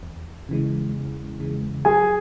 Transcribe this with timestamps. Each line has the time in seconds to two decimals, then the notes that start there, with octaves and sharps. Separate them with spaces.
0.03 E2
0.49 C#3 E3 G#3
0.94 E2
1.40 C#3 E3 G#3
1.85 F#3 G#4 G#5